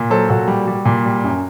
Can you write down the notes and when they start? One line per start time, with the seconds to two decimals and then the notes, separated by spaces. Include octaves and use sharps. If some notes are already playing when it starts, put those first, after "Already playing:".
Already playing: A#2
0.10 F#3 A4 C5
0.30 A#2 F#4 A4
0.48 G3
0.67 G3
0.85 A#2
1.05 G3
1.24 F#2